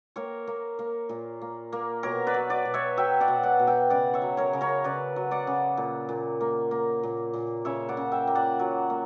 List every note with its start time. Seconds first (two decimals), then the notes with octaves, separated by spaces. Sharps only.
0.16 A#3 A#4 C#5
0.47 A#3
0.79 A#3
1.09 A#2
1.42 A#3
1.73 A#3
2.03 B2 A#4 C#5
2.27 B4 D5
2.34 F#3
2.50 B4 D5
2.65 B2
2.74 C#5 E5
2.97 F#3 E5 G5
3.20 D5 F#5
3.28 B2
3.43 D5 F#5
3.59 B2
3.67 E5 G5
3.90 C#3 D5 F#5
4.14 C#5 E5
4.22 F#3
4.37 A#4 C#5
4.53 C#3
4.61 A#4 C#5
4.84 C#3 B4 D5
5.16 F#3
5.31 D5 F#5
5.47 C#3
5.77 A#2
6.09 A#2
6.41 A#3
6.71 A#3
7.03 A#2
7.34 A#2
7.65 C#3 C#5 E5
7.89 D5 F#5
7.97 C#3
8.12 E5 G5
8.27 A#3
8.35 D5 F#5
8.59 F#3
8.90 A#3